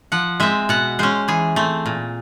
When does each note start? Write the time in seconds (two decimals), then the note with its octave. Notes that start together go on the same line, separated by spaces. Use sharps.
0.12 F3 F#5
0.40 G#3 C4 E5
0.69 B2 F#5
0.99 G#3 C#4 C5
1.28 E3 G#4
1.56 A3 C4
1.86 A#2